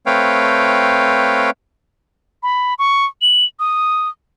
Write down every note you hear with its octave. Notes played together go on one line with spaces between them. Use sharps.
A3 C4 B4 C#5 F5 G5
B5
C#6
F#7
D#6